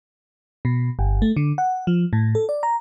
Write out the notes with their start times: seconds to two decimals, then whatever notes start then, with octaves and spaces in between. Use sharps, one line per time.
0.65 B2
0.99 G1
1.22 A3
1.36 D3
1.58 F#5
1.87 F3
2.13 A2
2.35 A4
2.49 D5
2.63 A#5